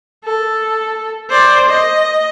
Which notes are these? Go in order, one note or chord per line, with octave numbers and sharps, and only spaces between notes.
A4
C5 D5
D#5